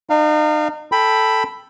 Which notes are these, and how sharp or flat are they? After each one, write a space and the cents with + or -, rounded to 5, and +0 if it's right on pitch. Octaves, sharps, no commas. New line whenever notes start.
D#4 -40 F5 -5
A4 +0 G5 +10 B5 +5